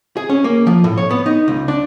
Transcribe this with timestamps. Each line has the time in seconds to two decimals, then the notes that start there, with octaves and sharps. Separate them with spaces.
0.17 G#4
0.30 C#4
0.44 A#3
0.67 F3
0.84 A2
0.98 C#5
1.11 B3
1.26 D#4
1.48 C#2
1.68 D4